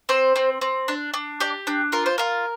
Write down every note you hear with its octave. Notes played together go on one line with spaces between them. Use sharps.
C4 C5
C4
C4
D4
D4
G4 D5
D4
F4 A#4
C5
F4 A#4